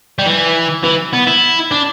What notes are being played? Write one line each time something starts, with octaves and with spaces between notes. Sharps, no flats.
G3
E3
E3
B3
E4
D4